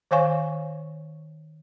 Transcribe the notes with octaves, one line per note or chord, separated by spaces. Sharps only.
D#3 C5 C#5 F5 G#5 C#6